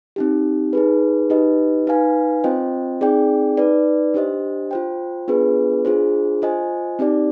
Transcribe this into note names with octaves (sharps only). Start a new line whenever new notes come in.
C4 D#4 G4
D#4 G#4 B4
D#4 G4 B4 D#5
D#4 B4 F5 G#5
C4 F4 C5 D#5 G5
C4 D#4 G#4 D5 G5
D#4 B4 D5
D4 G4 C5 D#5
F4 C5 G5
B3 D4 F4 G#4 B4
D4 F4 G#4 C5
F4 C5 D#5 G#5
C4 D#4 G4 D5